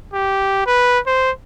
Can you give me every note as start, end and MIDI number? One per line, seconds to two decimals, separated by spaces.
0.14 0.64 67
0.66 0.99 71
1.06 1.31 72